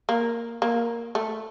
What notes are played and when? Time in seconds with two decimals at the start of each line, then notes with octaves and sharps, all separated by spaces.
0.09 A#3
0.62 A#3
1.15 A3